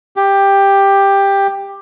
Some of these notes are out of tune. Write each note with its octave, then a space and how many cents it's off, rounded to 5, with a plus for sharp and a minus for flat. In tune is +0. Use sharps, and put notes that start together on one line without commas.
G4 +10